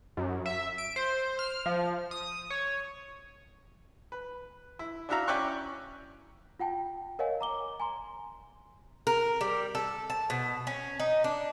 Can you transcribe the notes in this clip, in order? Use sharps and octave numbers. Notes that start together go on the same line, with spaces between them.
F#2
E5
D7
C5
F6
F3
D#6
C#5
B4
E4
D4 E4 F#4 E5 F5 A#5
C#4 E4 D5 G5 C#6 F#6
F4 F#5 G5 A5
A#4 C#5 D#5 F5 F#5 G#5
A#5 D6 G7
G#5 A#5 C6
A#4
G3
A4
A5
B2
C#4
D#4
D4